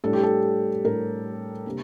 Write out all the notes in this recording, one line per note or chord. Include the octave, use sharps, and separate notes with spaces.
A2 G3 D4 A4
G4
A4
A2 G3 D4 A#4
C3 G3 A#3 D4